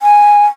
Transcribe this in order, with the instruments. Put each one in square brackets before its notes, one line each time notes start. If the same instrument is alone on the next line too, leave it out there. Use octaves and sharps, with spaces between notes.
[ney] G#5